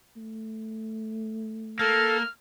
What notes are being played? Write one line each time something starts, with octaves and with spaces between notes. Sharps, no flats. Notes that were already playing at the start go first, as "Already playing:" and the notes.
A3
A#3 A4 F6